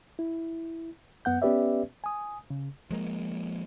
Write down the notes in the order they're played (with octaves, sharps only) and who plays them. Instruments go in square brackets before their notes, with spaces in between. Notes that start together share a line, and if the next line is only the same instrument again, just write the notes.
[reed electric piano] E4
F#2 B3 F#5 G6
B3 C#4 G4 B4 D5 E5
G#5 D#6
C#3
[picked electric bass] F3 G#3 A#3